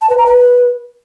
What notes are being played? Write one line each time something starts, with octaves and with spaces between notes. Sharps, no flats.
A5
B4
A#5
B4